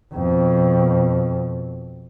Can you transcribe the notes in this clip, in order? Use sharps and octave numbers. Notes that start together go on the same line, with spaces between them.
F2 B2